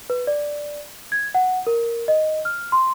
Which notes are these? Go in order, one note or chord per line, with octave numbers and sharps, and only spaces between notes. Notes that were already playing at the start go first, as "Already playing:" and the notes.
B4
D5
G#6
F#5
A#4
D#5
F6
C6